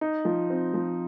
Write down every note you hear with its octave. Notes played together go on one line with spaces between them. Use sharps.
D#4
F3
C4
F3